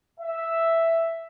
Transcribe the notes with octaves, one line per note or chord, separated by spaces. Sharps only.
E5